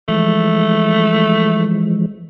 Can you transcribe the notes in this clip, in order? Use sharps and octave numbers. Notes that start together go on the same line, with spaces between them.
E3 F3 G#3 A3